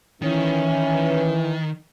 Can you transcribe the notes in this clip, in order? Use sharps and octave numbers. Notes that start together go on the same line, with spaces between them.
D#3 E3 C#4